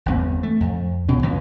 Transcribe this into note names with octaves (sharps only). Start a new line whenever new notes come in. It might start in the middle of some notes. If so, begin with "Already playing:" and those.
G1 E2 C4
A3
F2
C#2 B2 C#4
C#2 F#2 A#2 E3